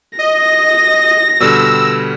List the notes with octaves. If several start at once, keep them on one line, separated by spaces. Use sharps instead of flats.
D#5 A#6
B2 D3 G3 E6